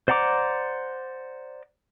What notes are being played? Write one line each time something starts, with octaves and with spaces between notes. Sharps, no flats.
C5 D5 F#5 A#5 D6